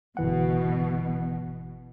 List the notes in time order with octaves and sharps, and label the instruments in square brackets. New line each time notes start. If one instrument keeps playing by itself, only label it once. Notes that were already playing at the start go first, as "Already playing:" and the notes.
[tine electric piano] G1 E3 F#5 [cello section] B2